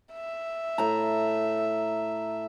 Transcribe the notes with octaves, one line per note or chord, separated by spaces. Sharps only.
E5
A2 A#5